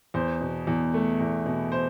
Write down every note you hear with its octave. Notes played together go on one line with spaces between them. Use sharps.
E2 C5
B2
E2
A3
E2
B2
C5